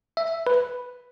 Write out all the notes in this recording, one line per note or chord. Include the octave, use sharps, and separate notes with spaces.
E5
B4